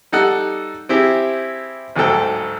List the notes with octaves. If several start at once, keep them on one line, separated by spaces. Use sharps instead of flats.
G3 D#4 A4 F#5
C4 E4 G4 G#4
A1 D2 G#2 F#3 A4 G5